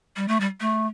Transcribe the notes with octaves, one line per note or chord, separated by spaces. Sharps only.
G3
A3
G3
A3